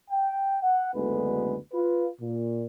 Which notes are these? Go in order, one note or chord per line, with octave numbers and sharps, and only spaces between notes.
G5
F#5
F#1 D2 D3 G#3 B3 B4
F4 B4
A#2